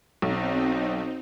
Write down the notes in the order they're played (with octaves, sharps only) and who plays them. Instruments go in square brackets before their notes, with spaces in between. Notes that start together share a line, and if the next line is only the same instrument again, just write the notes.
[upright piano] B1 [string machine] C4 D#4